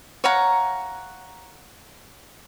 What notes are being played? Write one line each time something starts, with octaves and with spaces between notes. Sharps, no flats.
C#5 F5 F#5 A#5